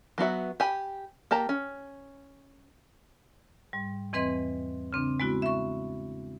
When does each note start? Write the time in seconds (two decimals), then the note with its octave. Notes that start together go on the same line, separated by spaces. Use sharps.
0.18 F#3 B3 F#4 E5
0.60 G4 G#5 B5
1.31 A#3 G4 A5 A#5
1.49 C#4
3.73 G#2 G3
4.13 E2 E3 C4 B4 D#5 C6
4.93 C#3 C4 D4
5.20 G#3 B3 E4 F#4
5.42 E5 C#6